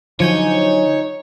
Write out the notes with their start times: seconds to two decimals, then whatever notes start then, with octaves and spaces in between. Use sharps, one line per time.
0.20 D3 F3 F#3 D#4 C#5 G#5 G6